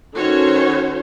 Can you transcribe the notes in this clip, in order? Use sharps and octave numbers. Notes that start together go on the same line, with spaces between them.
D#3 C#4 F#4 A4 C5 C#5